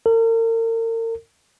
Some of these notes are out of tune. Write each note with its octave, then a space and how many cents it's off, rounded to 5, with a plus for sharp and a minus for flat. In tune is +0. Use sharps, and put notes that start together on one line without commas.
A#4 -40